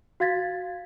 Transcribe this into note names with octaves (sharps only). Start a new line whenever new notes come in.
F#4 F5 G#6 A6 B6